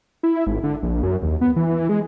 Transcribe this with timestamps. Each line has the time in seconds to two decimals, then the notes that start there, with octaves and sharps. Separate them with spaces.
0.23 E4
0.47 G#1
0.63 D3
0.83 A#1
1.03 F#2
1.22 D#2
1.41 B3
1.56 E3
1.89 G#3